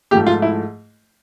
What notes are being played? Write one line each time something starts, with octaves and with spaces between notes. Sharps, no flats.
G#2 F3 A3 G4
F4
E4